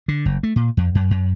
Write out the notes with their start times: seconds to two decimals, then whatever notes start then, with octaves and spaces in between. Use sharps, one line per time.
0.08 D3
0.26 F#1
0.43 A3
0.56 A#2
0.77 F2
0.95 F#2
1.11 F#2